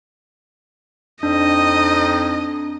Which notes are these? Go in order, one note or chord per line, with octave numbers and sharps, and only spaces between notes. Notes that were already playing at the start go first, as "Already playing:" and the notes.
F2 C4 D4 D#4 D#5